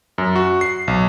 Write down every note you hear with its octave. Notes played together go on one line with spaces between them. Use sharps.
F#2
F#4
C7
B1